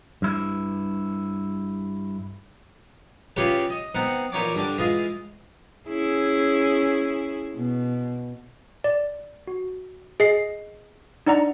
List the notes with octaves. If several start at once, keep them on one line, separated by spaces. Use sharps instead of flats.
G2 E4
C#3 E4 F4 G4 B4 C#5
D#5
B3 C4 D#4 F#5
A#2 E3 D#4 C#5 D6
G2 D3 G3 D6
E3 G#3 F4 D#5
C#4 E4 G#4
B2
D5
F#4
G#4 D#5 C7
D4 D#4 D5 F#5 A#5